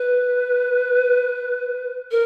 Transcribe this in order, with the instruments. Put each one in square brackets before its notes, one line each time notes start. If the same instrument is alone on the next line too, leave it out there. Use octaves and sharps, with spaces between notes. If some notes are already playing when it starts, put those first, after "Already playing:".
Already playing: [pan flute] B4
A#4